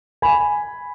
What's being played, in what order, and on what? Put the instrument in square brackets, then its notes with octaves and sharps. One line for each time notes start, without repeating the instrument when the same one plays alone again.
[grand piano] G#5 B5